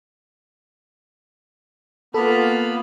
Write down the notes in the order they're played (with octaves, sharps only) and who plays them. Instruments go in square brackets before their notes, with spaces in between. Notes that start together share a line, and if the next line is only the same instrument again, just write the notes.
[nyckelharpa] A#3 F4 [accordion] B3 B5 [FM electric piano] A4